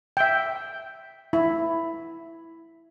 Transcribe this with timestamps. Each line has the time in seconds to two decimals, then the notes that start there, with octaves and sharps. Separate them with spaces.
0.17 E5 G5
1.33 E4